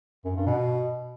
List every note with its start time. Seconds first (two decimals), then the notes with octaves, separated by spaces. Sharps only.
0.25 F#2
0.36 G2
0.46 B2